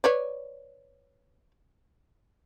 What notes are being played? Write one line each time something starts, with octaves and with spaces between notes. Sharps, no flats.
B4 C#5 D5